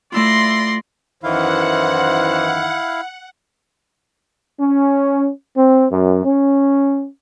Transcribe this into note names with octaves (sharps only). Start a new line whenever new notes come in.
A3 E4 F4 D5 C6 A#6
F#2 D#3 E3 E4 C5 F5 F#5
C#4
C4
F#2
C#4